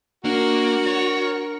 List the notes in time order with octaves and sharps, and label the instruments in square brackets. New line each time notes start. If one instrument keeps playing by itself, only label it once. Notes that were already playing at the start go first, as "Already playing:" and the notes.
[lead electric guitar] A#3 [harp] D4 [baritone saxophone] F#4 [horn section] A#4
[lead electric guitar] C#5